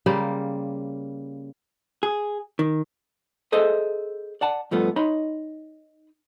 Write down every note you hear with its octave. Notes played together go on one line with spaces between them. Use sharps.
C#3 G3 A#3 C5
G#4
D#3
G#4 A4 C5 D#5 E5
D5 F#5 A5
G2 F3 A3 B3
D#4 C#5 D#5 B5 C6